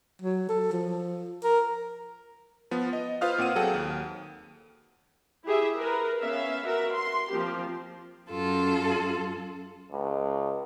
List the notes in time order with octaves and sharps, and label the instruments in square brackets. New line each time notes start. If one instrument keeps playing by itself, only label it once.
[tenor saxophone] F#3
A4
F3
A#4
[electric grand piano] F3 B3
D#5
F4 B4 C5 F5 D#6 F6
A#2 C4 F#5 D#7
F#3 G#4 A4 F#5 G5
D#2
[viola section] E4 G4 G#4 E5
A#4 B4
B3 C#4 E5 F5
F#4 A#4 E5
C6
F3 A#3 C4 G4
[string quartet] F#2 F4 A4
[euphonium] C#2